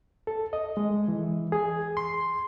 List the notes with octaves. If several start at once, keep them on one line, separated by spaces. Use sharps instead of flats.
A4
D#5
G#3
E3
G#4
C6